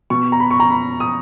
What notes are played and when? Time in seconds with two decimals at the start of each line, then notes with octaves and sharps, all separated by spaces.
0.10 B2 C#6
0.32 A#5
0.40 B5
0.51 C#6
0.60 A#5
0.70 B5
1.00 D#6